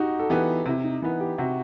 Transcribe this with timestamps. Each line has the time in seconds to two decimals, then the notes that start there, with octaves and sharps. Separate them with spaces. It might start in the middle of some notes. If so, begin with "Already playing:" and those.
Already playing: D#4 F#4 G4
0.19 A4
0.29 E3 B3 G4
0.66 C3 E4
0.84 D#4
1.02 E3 B3 E4
1.20 G4
1.38 C3 F#4